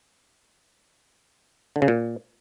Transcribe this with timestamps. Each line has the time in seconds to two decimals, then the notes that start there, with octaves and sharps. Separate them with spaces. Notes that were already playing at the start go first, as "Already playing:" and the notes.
1.76 D3
1.82 C#3
1.88 A#2